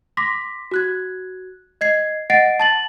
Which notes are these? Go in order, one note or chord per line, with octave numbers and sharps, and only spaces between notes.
C6 D6 A#6 B6
F#4 F#6 G#6
D#5 G#6 C7
D#5 F#5 A6 A#6 C7 D7
A5 A6 F#7